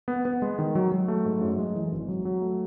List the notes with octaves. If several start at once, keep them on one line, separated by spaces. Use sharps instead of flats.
B3
B3
G#3
D#3
F#3
F#3
A3
G#2
F#2
G#3
E3
G#1
F#3
F#3
A3